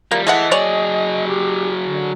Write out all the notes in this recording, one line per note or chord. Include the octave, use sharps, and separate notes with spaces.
F3 G3 A#3
E3 G#3 A3 D#5 F#5
F#3 G#4 C#5 D5
G4
D3